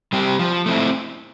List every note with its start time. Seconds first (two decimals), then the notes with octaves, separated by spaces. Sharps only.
0.13 G3 C4 G4
0.39 F3
0.66 A3 C4 E4